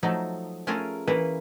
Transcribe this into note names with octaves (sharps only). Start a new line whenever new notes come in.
F3 F#3 A3 D#4
A3 C#4 F4 G#4 A#4
E3 A#3 C#4 B4